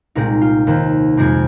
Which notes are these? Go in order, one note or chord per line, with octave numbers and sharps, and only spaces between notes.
C2 A#2 G#3 C4 D#4
F4
D#2 D#3 C4
F2 C3 G#3 C4 G#5